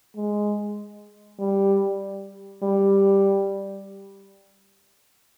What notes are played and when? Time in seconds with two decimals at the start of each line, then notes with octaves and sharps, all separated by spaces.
0.16 G#3
1.39 G3
2.63 G3